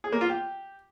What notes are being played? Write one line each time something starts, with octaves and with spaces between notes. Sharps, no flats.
G#4
A#3
F4
G4